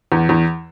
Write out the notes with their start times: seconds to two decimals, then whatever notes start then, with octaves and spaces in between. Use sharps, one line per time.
0.12 E2
0.29 E2